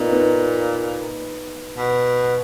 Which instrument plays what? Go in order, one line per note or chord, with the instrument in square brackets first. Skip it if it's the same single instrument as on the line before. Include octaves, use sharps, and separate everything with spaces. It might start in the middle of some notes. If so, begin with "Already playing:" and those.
Already playing: [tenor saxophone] A#2 [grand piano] B3 D#4
[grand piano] B3 D#4
[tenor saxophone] B2